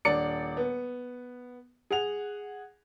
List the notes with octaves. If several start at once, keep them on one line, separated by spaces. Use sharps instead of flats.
D#1 D4 D5 C#7
B3
G#4 F#5 F7